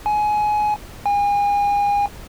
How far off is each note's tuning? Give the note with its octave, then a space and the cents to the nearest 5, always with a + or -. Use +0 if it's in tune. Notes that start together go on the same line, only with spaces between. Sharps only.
G#5 +20
G#5 -35